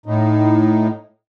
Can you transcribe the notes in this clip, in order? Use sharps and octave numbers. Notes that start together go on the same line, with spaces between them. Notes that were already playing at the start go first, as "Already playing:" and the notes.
A2 D#4